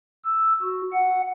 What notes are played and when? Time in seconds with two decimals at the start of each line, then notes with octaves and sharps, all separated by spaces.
0.24 E6
0.62 F#4
0.93 F#5